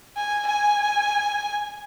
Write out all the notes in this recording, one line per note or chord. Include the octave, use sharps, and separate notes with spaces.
G#5
G#5